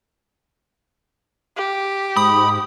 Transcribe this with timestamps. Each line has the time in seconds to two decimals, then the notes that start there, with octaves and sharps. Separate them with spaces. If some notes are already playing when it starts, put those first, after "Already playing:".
1.57 G4
2.17 G#2 B5 D#6